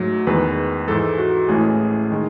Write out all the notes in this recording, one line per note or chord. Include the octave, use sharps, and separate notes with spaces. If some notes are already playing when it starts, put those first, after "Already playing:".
Already playing: G#2 F#3 A3
E2 D#3 G#3 B4
G#2 E3 G#3 A4
F#4
A1 A2 E3 G#3 G#4
D#3 G#3